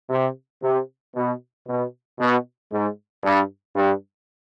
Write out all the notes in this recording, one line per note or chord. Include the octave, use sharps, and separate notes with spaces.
C3
C3
B2
B2
B2
G#2
G2
G2